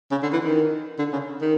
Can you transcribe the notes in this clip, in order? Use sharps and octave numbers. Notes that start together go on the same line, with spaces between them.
C#3
D3
E3
D#3
D3
C#3
D#3